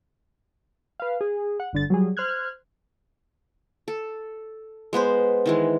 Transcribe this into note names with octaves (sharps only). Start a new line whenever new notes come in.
B4 F5
G#4
F#5
G1 D3 A6
F#3 G3 G#4
C5 F6 F#6 G#6
A4
G#3 B3 B4 C5
D#3 E3 G#3